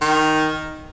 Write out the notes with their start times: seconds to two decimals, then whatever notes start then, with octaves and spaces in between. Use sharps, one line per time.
0.01 D#3